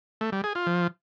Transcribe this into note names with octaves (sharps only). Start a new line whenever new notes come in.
A3
G3
G#4
F4
F3